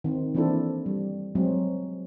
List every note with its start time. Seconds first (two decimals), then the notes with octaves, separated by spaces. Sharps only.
0.04 D#3 C4
0.35 E3 A#3 C4 D4 E4 A4
0.86 G3
1.35 F#3 G#3 C4